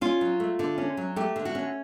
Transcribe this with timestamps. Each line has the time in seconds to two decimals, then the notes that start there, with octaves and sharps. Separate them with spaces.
0.01 C#4 F4
0.21 F#3
0.40 A3
0.59 D3
0.78 C#4
0.97 F#3
1.16 A3 G4
1.36 D3
1.45 F#4
1.55 C#4